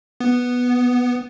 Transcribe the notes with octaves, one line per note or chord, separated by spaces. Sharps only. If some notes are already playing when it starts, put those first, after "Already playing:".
B3